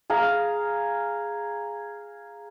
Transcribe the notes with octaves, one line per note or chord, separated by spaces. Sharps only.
G#4 F5 A#5